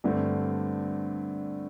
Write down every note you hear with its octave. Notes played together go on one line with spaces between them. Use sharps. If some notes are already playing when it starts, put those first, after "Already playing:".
G2 D3 A3 C4